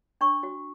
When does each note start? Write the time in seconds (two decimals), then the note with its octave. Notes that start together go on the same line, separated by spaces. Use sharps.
0.21 D4 C#6
0.43 F#4